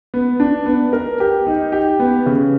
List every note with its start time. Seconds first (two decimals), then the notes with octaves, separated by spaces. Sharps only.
0.14 B3
0.40 D4
0.66 B3
0.93 A#4
1.20 G4
1.47 D#4
1.72 G4
1.99 B3
2.26 C#3